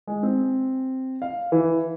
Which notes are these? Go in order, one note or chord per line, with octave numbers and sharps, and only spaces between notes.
G#3
C4
F5
E3